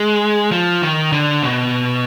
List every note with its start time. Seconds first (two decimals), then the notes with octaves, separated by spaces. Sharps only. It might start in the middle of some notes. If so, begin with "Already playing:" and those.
Already playing: G#3
0.52 F3
0.82 D#3
1.12 D3
1.43 B2